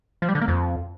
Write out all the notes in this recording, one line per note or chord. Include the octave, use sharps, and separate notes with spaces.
F3
G3
D3
A#3
F2